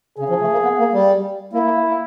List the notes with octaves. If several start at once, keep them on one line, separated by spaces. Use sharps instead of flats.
C#3 G#4
F3
A3
A#3
B3
A#3
G3
A#3 E4
A#3
A#3